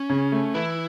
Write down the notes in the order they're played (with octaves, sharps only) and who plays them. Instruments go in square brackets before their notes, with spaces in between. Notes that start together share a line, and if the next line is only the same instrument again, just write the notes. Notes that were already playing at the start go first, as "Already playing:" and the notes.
Already playing: [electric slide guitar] C#4
[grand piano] C#3
A3
[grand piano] E3 [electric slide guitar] E4